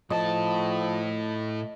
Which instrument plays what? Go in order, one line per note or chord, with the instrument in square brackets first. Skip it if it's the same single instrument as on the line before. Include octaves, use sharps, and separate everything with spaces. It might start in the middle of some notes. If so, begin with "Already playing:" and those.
[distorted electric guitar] A2 A5 [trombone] F3 [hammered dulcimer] D#5